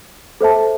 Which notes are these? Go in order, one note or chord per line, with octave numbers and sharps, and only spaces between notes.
A4 C5 E5 A5